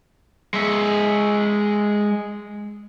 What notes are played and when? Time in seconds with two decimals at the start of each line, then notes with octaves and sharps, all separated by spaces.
0.54 G#3 E5